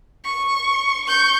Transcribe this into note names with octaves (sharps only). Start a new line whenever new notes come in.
C#6
C#6 G6